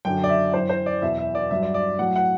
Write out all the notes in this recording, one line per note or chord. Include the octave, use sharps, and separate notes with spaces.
F#2 D3 F#3 G5
D5
E5
F#2 E3 C5
C5
D5
E2 B2 F#3 E5
E5
D5
G2 F#3 E5
D5
D5
A2 F#3 F#5
F#5